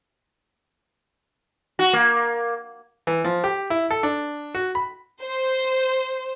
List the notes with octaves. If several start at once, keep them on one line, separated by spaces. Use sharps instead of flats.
F#4
A#3
E3
F3
G4
E4
A4
D4
F#4
B5
C5